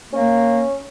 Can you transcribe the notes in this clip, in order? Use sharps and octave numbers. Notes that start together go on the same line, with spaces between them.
A#3 C#4